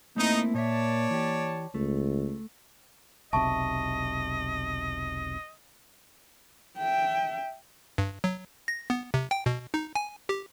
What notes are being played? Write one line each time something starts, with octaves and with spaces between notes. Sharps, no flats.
A3 A#3 C4 D#4 E4
A#2 C#5 D5 E5 A5
E3 G4
C#2 A3
E1 B1 C3 D#5 E5 A5 C#6
E5 G5
G2
F#3
A#6
B3
C3
G5
B2
D#4
G#5
G4